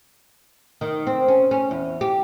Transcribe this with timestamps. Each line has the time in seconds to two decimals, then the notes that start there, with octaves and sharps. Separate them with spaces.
0.81 D#3
1.07 C4
1.28 C#4
1.51 C#4
1.71 E2
2.01 G4